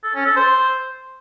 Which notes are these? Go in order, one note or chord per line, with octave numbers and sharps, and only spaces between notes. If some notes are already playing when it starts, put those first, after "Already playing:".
A4
C#4
A4
C5